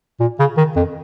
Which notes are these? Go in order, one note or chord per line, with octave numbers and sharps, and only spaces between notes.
A#2
C#3
D#3
F2